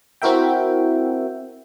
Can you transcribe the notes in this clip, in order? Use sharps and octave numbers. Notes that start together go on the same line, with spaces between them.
C4 E4 F#4 A#4 E5 G5